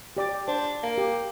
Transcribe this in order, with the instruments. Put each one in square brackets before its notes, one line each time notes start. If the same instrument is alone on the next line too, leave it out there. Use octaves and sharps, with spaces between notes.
[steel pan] G4 D5 D6
[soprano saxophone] D4 [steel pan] C5
[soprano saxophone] A#3
[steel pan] G4